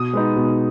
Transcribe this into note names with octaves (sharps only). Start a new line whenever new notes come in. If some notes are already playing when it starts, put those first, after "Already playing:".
Already playing: B2 D#6
G#3 B3 D#4
B2